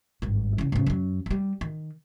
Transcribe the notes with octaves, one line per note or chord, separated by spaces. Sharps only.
G#1 G2
C#3 E4
G#2 C#3
F#2 F#3
G3 G#3
D#3